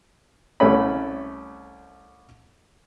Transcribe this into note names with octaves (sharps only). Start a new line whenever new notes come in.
C2 A3 C#4 B5